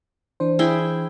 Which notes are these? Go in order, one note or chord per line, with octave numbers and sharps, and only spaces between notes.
E3 D4 C5
E4 G#4 G5